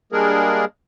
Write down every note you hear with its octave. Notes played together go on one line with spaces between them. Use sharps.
G3 G#3 A#3 D4 G#4 A#4